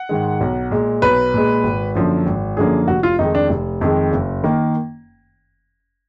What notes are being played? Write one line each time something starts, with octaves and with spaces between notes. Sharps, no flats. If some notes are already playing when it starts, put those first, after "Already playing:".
Already playing: F#5
G#2 D#3 G#3
B1
A#2 G#3
B1 B4
A#2 G#3
G#1
F#2 D3 F3 A#3
G#1
F#2 D3 F3 A#3 G#4
F1 F#4
F4
F2 D#3 G#3 D#4
D4
F1
F2 D#3 G#3
F#1
D#3 A#3